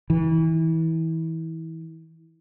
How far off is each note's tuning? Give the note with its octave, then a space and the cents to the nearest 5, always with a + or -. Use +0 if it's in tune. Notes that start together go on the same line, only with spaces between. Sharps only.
E3 -30